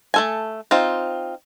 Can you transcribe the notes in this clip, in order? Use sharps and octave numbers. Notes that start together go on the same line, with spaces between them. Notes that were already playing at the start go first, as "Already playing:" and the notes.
A3 A4 G#5
C4 D#4 F4